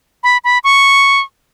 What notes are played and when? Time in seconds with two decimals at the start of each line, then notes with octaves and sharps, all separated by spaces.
0.23 B5
0.44 B5
0.64 C#6